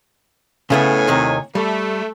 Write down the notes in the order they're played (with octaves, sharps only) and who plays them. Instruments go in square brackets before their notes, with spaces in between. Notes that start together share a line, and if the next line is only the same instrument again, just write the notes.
[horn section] A2 C#5 G#5 [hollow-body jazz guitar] C#3 A3 B3
[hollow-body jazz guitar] D#2 C3 D#3
[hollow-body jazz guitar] G3 [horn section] A3